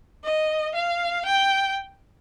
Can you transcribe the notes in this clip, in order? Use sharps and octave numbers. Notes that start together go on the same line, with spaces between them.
D#5
F5
G5